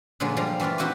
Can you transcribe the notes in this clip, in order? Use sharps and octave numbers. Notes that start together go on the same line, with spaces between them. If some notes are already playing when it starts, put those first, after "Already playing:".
A#2 D3 F3 F#3 G#3
D3 F3 G3 F5 A#5
E3 A3 D4 F4 A#4
C4 D#4 E4 F#4 G4 B4